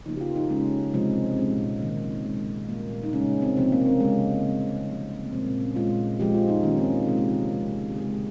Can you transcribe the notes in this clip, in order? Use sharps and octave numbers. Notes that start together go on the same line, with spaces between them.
C#3 F3 A#3 D#4
G4
F4
D#4
C#3 G#3 C#4
C3 F3 G#3
C#4
A#2 G#3 C4
C3 D#3 A#3
A#3
A#2 G#3 C4
A#2 G3 A#3
D#4
C#3 G#3 C#4
C4
C3 F3 A#3 C4
A#3
C#4
C4
C#3 G#3 C#4
C3 G3 A#3
C#3 F3 A#3 C4
A#3
A#2 F3 G#3 C4
C4
C#4
A#2 G#3 F4
A#2 F3 G#3 G4
F4
D#4
D#3 A#3 C#4
C4
F4
C3 F3 G#3 G#4
G4
F4
G4
C#3 F3 G#3
G4
C#3 F3 G#3 G#4
G4